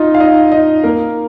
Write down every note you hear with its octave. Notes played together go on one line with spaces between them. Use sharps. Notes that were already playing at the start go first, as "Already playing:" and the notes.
Already playing: D#4 F4 D#5
F5
D#4 D#5
D#4 D#5
A#3 A#4